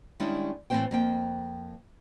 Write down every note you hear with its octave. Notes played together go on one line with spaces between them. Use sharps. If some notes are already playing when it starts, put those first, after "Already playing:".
D#3 G3 G#3 C#4 D4 E4
A2 E3 B3 C4 C5 G5
F2 A#3 G5